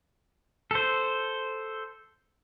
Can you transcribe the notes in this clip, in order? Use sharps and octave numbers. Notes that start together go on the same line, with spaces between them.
A4 C5